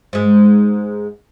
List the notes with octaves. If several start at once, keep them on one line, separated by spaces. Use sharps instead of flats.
G#2 G#3